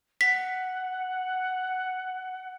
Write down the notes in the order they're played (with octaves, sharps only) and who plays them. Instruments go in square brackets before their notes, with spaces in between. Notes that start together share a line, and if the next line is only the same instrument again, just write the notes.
[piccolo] F#5 [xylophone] B6